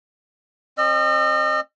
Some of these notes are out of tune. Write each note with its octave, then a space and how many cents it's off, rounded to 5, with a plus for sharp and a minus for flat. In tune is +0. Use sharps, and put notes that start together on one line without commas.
C4 +35 D#5 -35 E6 +45